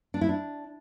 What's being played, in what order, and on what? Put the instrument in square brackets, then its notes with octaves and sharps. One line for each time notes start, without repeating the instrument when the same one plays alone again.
[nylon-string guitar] D4
E4
D4